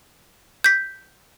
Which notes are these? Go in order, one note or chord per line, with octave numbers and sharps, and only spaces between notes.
G6 B6